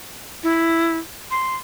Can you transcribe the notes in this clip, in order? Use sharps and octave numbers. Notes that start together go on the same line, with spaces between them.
E4
C6